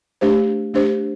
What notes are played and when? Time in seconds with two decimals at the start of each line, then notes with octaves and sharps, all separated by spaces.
0.21 A3 D4 G4 C5
0.74 A3 D4 G4 C5